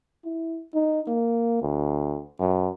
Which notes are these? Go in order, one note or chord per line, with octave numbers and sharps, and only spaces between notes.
E4
D#4
A#3
D2
F#2